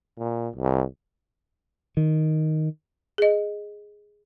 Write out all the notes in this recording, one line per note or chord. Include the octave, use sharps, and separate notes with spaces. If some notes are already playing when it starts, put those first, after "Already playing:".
A#2
C2
D#3
G#4 D#5